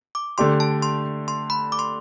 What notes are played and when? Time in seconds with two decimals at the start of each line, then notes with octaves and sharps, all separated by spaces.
0.15 D6
0.38 D3 A3 D4 G4 C6
0.60 A5
0.82 C6
1.28 C6
1.50 B5
1.72 D6
1.79 C6